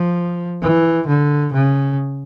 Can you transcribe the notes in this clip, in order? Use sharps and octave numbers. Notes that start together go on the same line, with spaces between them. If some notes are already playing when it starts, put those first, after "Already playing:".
Already playing: F3
E3
D3
C#3